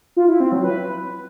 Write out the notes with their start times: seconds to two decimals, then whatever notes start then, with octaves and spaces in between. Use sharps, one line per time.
0.17 F4
0.28 E4
0.40 C4
0.52 F#3
0.64 B4